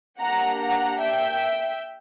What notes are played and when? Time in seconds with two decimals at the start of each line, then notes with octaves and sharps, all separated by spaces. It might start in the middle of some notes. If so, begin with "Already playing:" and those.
0.20 A#3 D4 G4 F#5 A#5
0.61 F#5 A#5
1.01 E5 G5